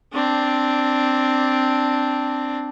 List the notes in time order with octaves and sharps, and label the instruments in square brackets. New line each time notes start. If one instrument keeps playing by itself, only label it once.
[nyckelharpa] C4 D4